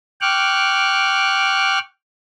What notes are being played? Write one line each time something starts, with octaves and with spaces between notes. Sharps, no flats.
G5 C#6 D6 F6 F#6